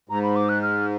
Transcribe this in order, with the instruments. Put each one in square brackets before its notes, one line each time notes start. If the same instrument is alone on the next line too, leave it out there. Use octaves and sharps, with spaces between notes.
[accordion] G#2 [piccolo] A#5
[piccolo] B5
D6
F#6
F6